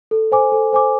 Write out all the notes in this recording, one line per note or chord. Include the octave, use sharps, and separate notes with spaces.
A4
C5 G#5 D6
A4
C5 G#5 D6